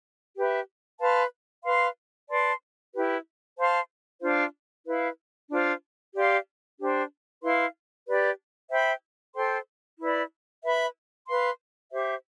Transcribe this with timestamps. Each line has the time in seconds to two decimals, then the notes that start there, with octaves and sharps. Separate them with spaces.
0.36 G4 B4 E5
1.01 B4 F5 A5 C6
1.65 B4 F5 C6
2.30 B4 D5 A5 C6
2.94 E4 G4 B4
3.57 C5 F5 A5 C6
4.21 D4 F4 C5 F5
4.86 E4 B4 F5
5.50 D4 F4 C5
6.15 G4 D5 F5 C6
6.79 D4 G4 C5
7.43 E4 B4 F5 C6
8.07 G4 B4 D5
8.71 C5 E5 G5 B5
9.35 A4 C5 G5 C6
9.99 E4 B4 D5
10.64 B4 E5 B5
11.27 B4 F5 C6
11.92 G4 C5 E5